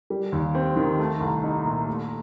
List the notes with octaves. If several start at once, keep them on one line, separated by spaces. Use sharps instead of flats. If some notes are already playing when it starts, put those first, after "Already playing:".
G3
D#2
C4
D#3
A3
C2
D#4
A#2
A3